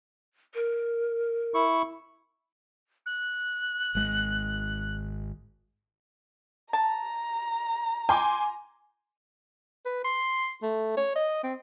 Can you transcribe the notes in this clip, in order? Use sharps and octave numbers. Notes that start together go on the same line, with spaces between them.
A#4
E4 C#6
F#6
G#1 G#3
A5 A#5
G5 G#5 C6 D6
B4
C6
A3
C#5
D#5
C4